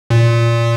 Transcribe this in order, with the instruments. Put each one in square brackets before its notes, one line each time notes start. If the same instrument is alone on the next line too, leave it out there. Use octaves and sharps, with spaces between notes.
[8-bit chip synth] A#2